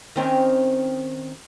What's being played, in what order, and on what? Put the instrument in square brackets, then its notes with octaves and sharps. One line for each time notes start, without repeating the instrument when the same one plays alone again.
[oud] D#3 C4 C#4